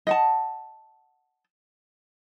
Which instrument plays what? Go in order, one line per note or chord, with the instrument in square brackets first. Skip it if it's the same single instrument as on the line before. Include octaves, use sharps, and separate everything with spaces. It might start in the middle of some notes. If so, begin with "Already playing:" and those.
[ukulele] D#5 F#5 A5